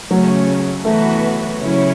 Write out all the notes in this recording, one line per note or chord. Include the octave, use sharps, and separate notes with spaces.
C#3 F#3 A3 C#4
E3 A3 B3 F#4 B4
C#3 F#3 C#4 E4 C#5